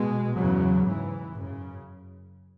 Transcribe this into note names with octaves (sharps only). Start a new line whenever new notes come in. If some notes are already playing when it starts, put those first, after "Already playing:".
Already playing: B2 G#3
E2 C#3 F#3
G#2 E3
F#2 C#3